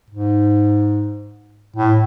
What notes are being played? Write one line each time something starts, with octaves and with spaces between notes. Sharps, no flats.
G#2
A2